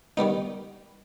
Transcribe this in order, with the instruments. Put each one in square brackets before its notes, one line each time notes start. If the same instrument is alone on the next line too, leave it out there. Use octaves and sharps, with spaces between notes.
[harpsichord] D#3 G3 B3 D#4